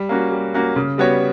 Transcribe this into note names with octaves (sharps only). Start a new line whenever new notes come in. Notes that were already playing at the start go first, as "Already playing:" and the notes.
Already playing: G3
A#3 C#4 F#4
G3
A#3 C#4 F#4
C#3
G3 B3 F#4 C#5